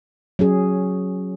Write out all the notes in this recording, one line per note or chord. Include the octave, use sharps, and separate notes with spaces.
F#3 C#4 G#4